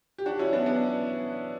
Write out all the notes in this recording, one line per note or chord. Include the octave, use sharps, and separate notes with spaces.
G4
D4 F#4
C#4 E4
B3 D4
B3 D4